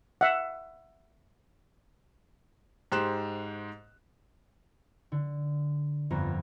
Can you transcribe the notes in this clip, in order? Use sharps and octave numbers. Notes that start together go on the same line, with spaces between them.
E5 F#5
G#2 G4 C5 C6 F#6 E7
D3
G1 F2 B3 A#5